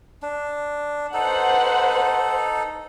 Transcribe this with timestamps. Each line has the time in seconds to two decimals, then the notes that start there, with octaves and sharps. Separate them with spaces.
0.22 D4
1.14 D#4 A4 B4 C5 F#5